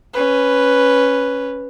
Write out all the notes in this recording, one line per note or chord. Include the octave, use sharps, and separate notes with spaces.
C#4 B4